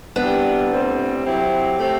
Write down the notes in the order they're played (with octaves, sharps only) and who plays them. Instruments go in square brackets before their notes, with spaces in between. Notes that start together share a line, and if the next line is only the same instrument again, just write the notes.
[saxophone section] C3 E3 G3 [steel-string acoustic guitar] B3 D4
[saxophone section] A2 G3 C4
F#3 C4 E4 G4
A3 C4 G4